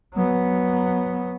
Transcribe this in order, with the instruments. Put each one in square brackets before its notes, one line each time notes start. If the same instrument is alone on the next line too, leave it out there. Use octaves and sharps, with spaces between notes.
[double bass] F#3 B3